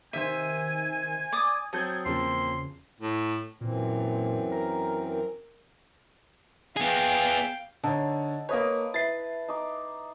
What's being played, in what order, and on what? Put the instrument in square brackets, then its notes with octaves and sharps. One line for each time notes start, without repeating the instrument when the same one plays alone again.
[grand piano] C3 C5 [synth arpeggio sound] D#3 D#7 [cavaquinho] E5 [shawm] G#5
[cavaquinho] D5 D6 D#6
[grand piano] F#3 C4 [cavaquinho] A4 [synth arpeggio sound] D#6 G6 G#6
[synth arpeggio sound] E2 C#3 [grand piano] F3 A#3 C4 [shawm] C6
[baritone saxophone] A2
[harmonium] F#2 E3 C4 [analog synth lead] A#2
[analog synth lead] A#4
[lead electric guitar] B3 G#4 [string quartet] F5 G5
[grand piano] D3 C#5 [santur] D#4 A5
[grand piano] A#3 C#5 [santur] B4 D#5
[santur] E4 B4 [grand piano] A6 C7
[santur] D#4 D6